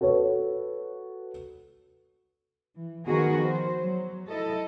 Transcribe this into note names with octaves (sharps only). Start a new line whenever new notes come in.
F#4 A4 B4 C#5
E3
D#3 F3 B3 F#4 G#4 A#4
C5
F#3
E4 A4 D#5